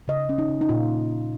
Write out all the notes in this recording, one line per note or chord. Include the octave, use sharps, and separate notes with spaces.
C#3 D#5
C#4
D#4
C#3
D#4
A#2 F4